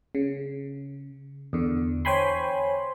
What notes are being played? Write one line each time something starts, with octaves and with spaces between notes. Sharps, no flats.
C#3
E2 D3
C5 C#5 G5 G#5 B5 C6